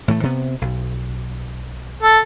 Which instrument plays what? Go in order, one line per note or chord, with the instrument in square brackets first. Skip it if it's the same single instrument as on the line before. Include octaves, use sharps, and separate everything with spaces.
[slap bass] A2 E3 A3
C3 B3
B1
[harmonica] A4